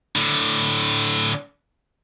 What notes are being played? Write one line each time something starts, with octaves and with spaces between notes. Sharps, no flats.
A2 D3